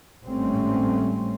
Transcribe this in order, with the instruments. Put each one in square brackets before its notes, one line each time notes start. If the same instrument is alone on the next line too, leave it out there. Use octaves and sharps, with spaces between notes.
[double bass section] G#1 A2 G3 A3 C4 C#4